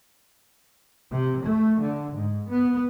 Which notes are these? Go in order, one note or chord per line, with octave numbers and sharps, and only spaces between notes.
C3
A3
D3
G#2
B3